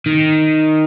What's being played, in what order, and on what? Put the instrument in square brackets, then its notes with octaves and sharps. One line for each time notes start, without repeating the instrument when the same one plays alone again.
[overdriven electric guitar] D#3